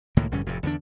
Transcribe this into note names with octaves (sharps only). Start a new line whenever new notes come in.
C#2 A2 D#3 A#3
A#1 G2 D3 C#4
F1 F2 A2
E2 D3 F3 D4